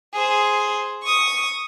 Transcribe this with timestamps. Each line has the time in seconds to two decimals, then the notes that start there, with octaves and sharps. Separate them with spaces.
0.14 G#4 C5
1.04 C#6 D#6